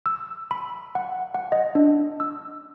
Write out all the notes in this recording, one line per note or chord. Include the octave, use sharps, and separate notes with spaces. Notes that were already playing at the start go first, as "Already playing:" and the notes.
E6
B5
F#5
F#5
D#5
D4
E6